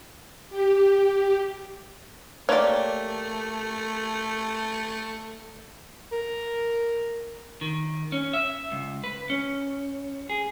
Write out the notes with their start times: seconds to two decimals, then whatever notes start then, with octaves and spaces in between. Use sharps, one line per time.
0.50 G4
2.49 A3 A#3 G4 C#5 D5
6.12 A#4
7.61 D#3
8.12 C#4
8.33 E5
8.72 C#2
9.04 B4
9.30 C#4
10.29 G#4